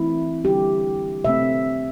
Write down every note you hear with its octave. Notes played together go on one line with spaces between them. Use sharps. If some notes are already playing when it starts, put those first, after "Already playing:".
Already playing: E3 A3 C4 E4
D3 G3 D4 G4
C3 A3 C4 E5